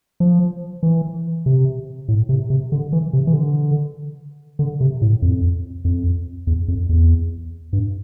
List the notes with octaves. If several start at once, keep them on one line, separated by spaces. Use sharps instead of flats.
F3
E3
C3
A2
C3
C3
D3
E3
C3
E3
D3
D3
C3
A2
F2
F2
E2
F2
E2
G2